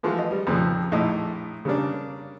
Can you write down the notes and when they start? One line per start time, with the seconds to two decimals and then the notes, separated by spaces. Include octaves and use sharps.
0.03 E3 F3 G#3 A3 F4 F#4
0.18 D#5
0.31 G3
0.47 F2 A#2 C#3 F3
0.91 A#1 A2 D#5
1.65 C#3 G3 A#3 C#4 D4